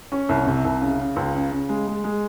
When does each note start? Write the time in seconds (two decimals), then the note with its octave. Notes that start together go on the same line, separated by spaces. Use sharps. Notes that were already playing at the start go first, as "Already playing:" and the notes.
0.12 C#4
0.29 C2
0.46 C3
0.65 C2
0.81 C#3
0.99 C#3
1.16 C#2
1.34 C#3
1.52 C#3
1.69 G#3
1.87 G#3
2.04 G#3